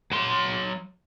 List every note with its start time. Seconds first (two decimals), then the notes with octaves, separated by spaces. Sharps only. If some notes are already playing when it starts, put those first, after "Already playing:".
0.12 F#3 C6